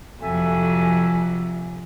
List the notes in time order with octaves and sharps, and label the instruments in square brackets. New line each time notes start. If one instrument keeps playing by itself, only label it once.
[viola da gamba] F2 C3 F#3 [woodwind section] A4 E5 G#5